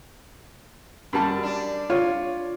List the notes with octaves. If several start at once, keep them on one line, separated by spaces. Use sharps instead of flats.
F#2 G3 A5
D4
F4 C#5